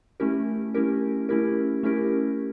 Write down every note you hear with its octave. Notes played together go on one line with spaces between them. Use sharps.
A3 C#4 E4 G4 A#4
A3 C#4 E4 G4 A#4
A3 C#4 E4 G4 A#4
A3 C#4 E4 G4 A#4